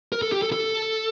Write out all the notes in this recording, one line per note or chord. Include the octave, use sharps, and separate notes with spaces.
A#4
A4
G4
A4
A4